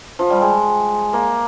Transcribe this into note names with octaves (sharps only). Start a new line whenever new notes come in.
F3
G3
G#3
A#3